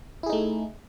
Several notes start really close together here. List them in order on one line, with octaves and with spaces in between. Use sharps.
E4 G#4 D#4 A3